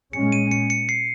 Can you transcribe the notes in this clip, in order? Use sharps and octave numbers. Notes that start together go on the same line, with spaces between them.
A#2 G#3 C#4 C#7
D#7
C#7
C#7
C7